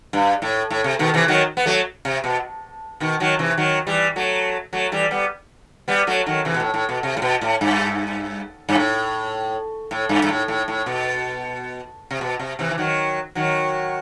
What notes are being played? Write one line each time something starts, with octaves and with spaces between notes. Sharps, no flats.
G2
A2
A2
C3
B2 D#3
C3 E3
D#3 F#3
B3
F#3 A3
C3
B2
B2 D#3
D#3 F#3
C3 E3
D#3 F#3
E3 G3
F#3 A3
F#3 A3
E3 G3
G3 B3
G3 B3
F#3 A3
D#3 F#3
C3 E3
B2
A2
A2
B2
C3
A2
B2
A2
G2
G2
A2
A2
G2
G2
A2
A2
A2
B2
C3
B2
C3
C3 E3
E3
D#3 F#3
D#3 F#3